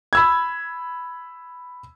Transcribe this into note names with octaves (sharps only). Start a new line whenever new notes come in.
B5 E6 G#6